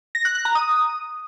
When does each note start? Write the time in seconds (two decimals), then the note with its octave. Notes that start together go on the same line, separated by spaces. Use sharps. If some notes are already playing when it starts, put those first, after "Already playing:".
0.15 A#6
0.25 F#6
0.35 F#6
0.45 A#5
0.55 D#6